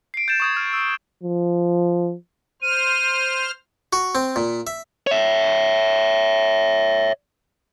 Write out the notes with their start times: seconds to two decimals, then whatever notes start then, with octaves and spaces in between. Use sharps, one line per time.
0.14 C7 D7
0.28 G6 A6 E7
0.40 C#6 D#6 G#6
0.57 F6
0.73 E6
1.23 F3
2.62 C5 F6 D#7
3.93 F#4
4.15 C4
4.36 A#2
4.67 E5
5.07 C#5 E5